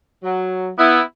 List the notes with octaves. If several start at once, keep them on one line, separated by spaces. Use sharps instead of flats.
F#3
B3 E4